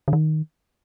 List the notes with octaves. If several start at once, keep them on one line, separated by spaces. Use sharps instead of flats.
D3
D#3